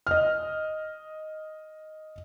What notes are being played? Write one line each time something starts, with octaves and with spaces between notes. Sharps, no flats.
D#5 F6